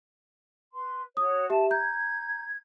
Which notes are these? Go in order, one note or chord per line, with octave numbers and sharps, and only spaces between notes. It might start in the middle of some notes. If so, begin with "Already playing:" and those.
B4 C6
F#4 C#5 D#6
G4 E5 A5
A#5 G6 G#6